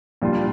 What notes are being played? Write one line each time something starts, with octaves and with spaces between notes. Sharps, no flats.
A#2 G3 D4 F4